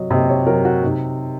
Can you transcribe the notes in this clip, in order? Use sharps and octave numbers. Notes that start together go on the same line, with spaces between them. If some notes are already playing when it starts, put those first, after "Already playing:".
Already playing: C3 F#3 D#5
C3 D#5
C#5
F#3 A#4
F#4
C3 D#4